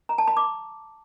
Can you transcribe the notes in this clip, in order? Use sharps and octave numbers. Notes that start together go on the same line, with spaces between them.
A#5
A5
B5
D6